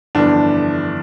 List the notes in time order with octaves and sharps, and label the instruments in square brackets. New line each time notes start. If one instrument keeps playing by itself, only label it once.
[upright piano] G1 F2 E3 G3 D4